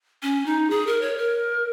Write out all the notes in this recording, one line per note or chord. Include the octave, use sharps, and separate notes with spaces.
C#4
D#4
G#4
A#4
C#5
A#4